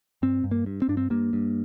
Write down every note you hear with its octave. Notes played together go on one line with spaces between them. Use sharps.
G2 C4
G2
A#3
G2
C4
G2 D4
C4
G2 A#3
G2